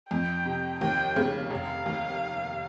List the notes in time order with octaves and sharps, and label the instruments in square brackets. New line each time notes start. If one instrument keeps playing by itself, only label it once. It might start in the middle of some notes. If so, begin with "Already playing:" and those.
[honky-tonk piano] F2 [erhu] G5
[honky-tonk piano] C3
[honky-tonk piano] D#2 [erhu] G5
[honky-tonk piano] C#3
[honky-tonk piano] F1 [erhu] F5
[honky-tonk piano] D#2